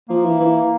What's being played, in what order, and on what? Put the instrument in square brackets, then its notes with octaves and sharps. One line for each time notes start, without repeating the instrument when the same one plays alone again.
[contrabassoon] F3 [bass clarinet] A#3
[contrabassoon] E3
E3